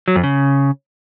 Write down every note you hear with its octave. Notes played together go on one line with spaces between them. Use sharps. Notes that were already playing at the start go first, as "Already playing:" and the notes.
F#3
F2
C#3